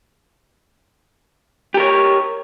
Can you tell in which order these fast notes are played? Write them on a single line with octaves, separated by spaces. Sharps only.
G4 A#4 C#5